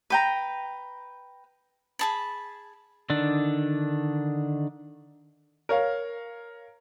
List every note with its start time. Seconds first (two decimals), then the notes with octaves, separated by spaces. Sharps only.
0.10 B4 G5 A#5
1.99 G#4 A5 B5
3.10 D3 D#3 D4
5.69 A#4 C#5 F5